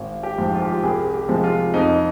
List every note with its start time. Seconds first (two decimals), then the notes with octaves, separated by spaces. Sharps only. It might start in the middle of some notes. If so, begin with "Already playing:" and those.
Already playing: G#1
0.23 G4
0.38 G#2 F3
0.54 F4
0.62 G4
0.71 F4
0.83 C2 G#4
1.14 G4
1.29 C3 F3 G#3
1.44 F4
1.74 F2 D#4